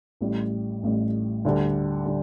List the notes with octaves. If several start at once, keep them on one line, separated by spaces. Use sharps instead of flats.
A1 A2 G3
A1 A2 G3
D2 D3 G3
D3 G3